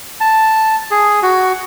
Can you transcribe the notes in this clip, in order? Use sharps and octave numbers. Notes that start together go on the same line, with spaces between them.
A5
G#4
F#4